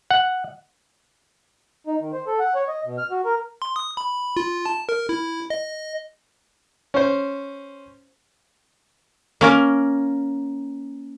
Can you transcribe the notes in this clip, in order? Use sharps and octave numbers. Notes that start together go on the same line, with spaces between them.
F#5
D#4
D#3
C5
A4
F#5
C#5
D#5
B2
F6
F#4
A#4
C6
D#6
B5
F4
A5
A#4
E4
D#5
C#4 C5
A#3 C#4 A#4